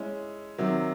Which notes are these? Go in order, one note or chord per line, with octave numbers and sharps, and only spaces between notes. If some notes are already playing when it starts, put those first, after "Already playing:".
Already playing: G#3 C#4 E4
C3 D#3 F#3